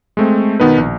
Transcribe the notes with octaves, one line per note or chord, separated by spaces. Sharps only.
G#3 A3 C4
B2 D#3 B3 D#4 B4
A#1